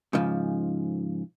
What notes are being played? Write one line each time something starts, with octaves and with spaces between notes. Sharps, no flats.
G#2 C#3 F3